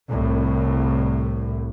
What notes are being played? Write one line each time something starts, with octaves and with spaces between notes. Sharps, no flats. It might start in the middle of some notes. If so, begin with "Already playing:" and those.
C2 A2